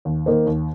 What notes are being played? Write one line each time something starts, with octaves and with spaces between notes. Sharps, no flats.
D#2
D#3 A#3 D#4 C5
D#2